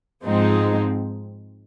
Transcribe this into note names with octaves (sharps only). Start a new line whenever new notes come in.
G#2 F3 G#3 C4 D#4